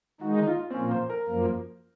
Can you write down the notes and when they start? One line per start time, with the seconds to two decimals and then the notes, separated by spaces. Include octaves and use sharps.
0.21 D#3 G#3 D#4 F#4
0.43 D#4
0.47 F4
0.70 C4
0.73 A#2 F3 A#3 C#4
0.91 C5
1.10 A#4
1.27 F#2 F3 A#3